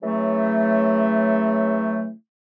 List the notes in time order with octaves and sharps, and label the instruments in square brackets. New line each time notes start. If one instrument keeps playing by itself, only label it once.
[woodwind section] C#3 E3 F#3 A3